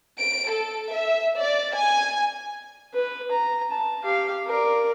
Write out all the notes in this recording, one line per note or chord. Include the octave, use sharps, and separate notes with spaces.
D7
A4
E5
D5
G#5
B4
A#5
A5
G4 F5
A#4 D5